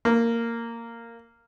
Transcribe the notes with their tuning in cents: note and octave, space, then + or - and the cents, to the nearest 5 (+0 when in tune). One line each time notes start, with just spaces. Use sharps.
A#3 -10